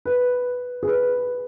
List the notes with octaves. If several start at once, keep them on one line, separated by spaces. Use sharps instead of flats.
B4
G#4
B4